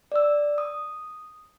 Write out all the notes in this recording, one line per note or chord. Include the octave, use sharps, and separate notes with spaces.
D5 E6
D#6